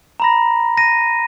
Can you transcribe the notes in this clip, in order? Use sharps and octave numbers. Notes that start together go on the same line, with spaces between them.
A#5 B5 A#6
A#6 D#7